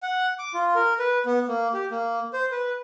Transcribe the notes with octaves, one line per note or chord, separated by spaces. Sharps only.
F#5
D6
F4
A#4
B4
B3
A#3
G4
A#3
C5
B4